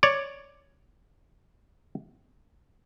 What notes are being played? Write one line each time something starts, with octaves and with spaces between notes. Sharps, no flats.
C#5 D5